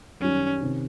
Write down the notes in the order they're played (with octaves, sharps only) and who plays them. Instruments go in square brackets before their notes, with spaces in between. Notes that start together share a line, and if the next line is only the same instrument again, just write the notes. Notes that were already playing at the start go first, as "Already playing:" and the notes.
[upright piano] F#2 D#3 G3 [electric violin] C#4
[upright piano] C3 D#3